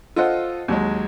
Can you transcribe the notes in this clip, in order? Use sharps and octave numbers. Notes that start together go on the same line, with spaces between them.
F4 A4 C5 D#5 F#5
D#2 F#3 G#3